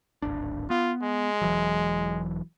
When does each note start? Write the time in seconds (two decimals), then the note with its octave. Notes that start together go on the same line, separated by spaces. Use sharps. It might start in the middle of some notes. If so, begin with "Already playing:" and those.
0.22 D1 G#1 D4
0.70 B3 F4
1.02 G#3
1.42 E1 E3 F#3